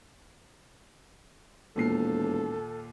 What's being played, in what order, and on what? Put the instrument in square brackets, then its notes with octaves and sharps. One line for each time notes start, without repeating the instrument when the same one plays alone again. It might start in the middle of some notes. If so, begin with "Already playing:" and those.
[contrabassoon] E1 [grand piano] D#2 A#2 C7 [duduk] A4